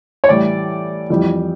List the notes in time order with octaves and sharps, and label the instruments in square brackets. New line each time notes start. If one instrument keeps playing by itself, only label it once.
[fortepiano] C#5
A2 E3 G3 D5
F2 E3 G3